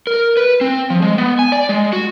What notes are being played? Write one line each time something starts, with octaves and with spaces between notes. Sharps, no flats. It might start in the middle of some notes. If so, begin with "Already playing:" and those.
A#4
B4
C4
F3
G#3
B3
G#5
D5
G#3
F#4